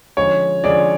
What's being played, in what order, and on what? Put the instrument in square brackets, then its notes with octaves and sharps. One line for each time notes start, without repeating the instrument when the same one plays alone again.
[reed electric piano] D3 F3 G#3 C#4 G#4 [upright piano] C#5
[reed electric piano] D3 F3 G#3 C#4 G#4 [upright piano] D5